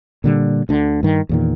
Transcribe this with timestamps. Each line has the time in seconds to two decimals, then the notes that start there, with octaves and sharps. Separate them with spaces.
0.24 A#2 D3 G3
0.69 D2 D3
1.03 G2 D#3
1.29 E2 A#2 D#3